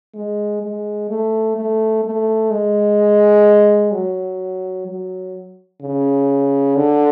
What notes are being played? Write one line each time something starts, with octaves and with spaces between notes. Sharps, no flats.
G#3
G#3
A3
A3
A3
G#3
F#3
F#3
C#3
D3